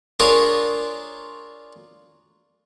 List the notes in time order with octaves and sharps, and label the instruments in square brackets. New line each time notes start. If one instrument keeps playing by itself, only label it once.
[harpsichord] D4 F4 G#4 A#4 C#5